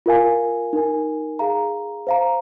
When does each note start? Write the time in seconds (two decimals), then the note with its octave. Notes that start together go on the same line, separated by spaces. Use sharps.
0.06 F4 A#4 F5 G#5
0.73 D#4 A#4 G#5
1.39 G#4 F5 A#5
2.07 C5 F5 A#5